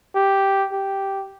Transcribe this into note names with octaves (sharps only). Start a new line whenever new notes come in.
G4
G4